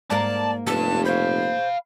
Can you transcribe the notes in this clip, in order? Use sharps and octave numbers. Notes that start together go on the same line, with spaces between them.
G#2 A#3 A#4 D5 A5
F1 G3 B4 A5
C5 F5 B5